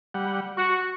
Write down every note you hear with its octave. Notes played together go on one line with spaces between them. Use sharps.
G3 F#5
F#4 C#6